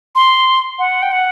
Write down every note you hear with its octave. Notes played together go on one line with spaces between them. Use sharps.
C6
F#5
G5
F#5